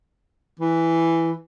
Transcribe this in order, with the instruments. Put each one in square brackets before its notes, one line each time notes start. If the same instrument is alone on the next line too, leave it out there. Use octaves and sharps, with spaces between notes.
[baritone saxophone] E3